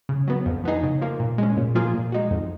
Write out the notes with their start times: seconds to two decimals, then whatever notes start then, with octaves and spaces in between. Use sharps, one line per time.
0.09 C#3
0.27 F#3 B3
0.46 F2
0.64 F3 B3 D#4 G#4
0.83 C#3
1.01 F3 A#3
1.20 A#2
1.38 G#3 C#4
1.57 A#2
1.75 F3 A#3 F4 G#4
1.94 A#2
2.12 G#3 D#4 F#4
2.31 F2